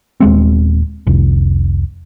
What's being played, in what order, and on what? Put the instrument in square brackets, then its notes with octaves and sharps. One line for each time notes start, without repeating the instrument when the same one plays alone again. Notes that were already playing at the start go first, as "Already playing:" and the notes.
[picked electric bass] D#1 G#3 C4
F1 C2